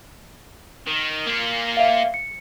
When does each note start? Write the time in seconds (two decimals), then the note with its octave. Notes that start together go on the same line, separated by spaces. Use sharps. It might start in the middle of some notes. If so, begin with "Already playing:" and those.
0.87 D#3
1.26 A#3 F4
1.77 E5 F5
2.14 C#7